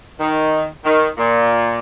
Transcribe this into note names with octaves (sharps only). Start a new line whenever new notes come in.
D#3
D#3
A#2